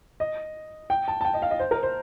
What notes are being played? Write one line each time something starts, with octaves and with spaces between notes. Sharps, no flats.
D#5
G5
A5
A5
G5
D#5
F5
D#5
C5
A#4
C5